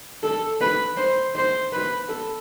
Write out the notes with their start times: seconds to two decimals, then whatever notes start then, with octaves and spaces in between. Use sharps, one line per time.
0.23 A4
0.61 B4
0.97 C5
1.35 C5
1.73 B4
2.09 A4